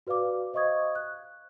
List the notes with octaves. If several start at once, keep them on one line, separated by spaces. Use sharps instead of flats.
F#4 B4 D5 F5 D6
C5 D#5 F5 C#6 D#6 G#6
F#6